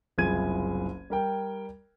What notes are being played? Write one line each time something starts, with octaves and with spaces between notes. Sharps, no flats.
F#1 C2 F4 G#4 G#6 D#7
G3 A#4 G5